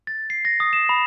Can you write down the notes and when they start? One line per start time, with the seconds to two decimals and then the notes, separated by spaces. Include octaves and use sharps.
0.07 A6
0.30 C7
0.45 A#6
0.60 D#6
0.73 E7
0.89 B5